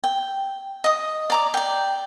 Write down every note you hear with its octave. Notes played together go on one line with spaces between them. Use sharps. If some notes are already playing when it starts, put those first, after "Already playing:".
G5
D#5 D#6
D5 A#5 D6
D5 G5